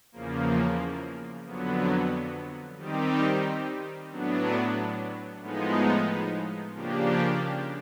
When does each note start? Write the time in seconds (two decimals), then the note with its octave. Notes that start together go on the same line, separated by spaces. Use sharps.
0.12 E2 C#3 F3 A#3
1.45 F2 D3 F#3 B3
2.77 D#3 G3 C4 D#4 G4
4.09 A2 F#3 B3 D4
5.41 A2 F3 G#3 B3 D#4
6.73 C#3 F3 A#3 D4 G4